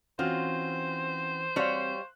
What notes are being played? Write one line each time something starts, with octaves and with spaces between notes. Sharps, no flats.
E3 C4 C#4 F4 F#4 C5
G3 C4 F#4 C#5 D5 F5 C6 F#6